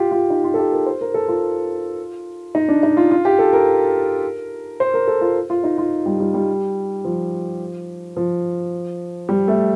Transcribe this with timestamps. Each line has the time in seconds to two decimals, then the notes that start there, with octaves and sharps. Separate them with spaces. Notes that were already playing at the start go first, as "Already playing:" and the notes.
Already playing: F4 G4
0.11 F4
0.30 D#4
0.44 F4
0.54 A4
0.58 G4
0.72 A#4
0.86 C5
1.01 A#4
1.14 A4
1.28 F4
2.55 D#4
2.69 D4
2.83 D#4
2.97 F4
3.11 F4
3.25 G4
3.39 A4
3.53 A#4
4.80 C5
4.94 A#4
5.07 A4
5.21 F4
5.50 F4
5.64 D#4
5.78 F4
6.06 G3
6.20 G3
6.34 G3
7.05 F3
8.17 F3
9.29 G3
9.48 A3